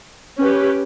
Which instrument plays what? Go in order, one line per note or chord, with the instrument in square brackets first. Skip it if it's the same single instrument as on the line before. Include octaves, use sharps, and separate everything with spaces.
[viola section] C#4 G4 B4